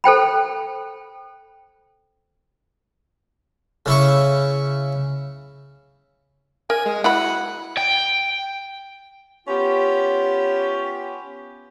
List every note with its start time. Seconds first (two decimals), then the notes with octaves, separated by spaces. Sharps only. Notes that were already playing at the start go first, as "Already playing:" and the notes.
0.04 A4 C5 G5 B5
3.86 C#3 E4 C#6
6.70 A#4 G#5
6.85 G#3
7.04 E4 F#4 F#5 B5
7.77 G5
9.47 B3 C#4 F4 G4